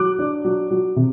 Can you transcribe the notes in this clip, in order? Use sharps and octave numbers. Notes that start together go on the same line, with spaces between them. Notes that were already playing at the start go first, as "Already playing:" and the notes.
Already playing: F#3 D6 F#6
D4
F#3
F#3
C3